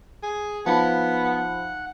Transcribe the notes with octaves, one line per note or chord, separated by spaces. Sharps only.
G#4
F3 B3 D#4 F5 F#5 A5 B5